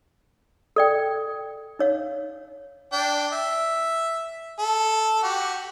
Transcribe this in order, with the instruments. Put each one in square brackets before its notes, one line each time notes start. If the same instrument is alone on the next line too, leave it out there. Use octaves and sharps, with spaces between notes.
[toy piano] A4 D5 G5
D#4 C#5 F5
[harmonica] D4 G5
E5
A4
F#4 G4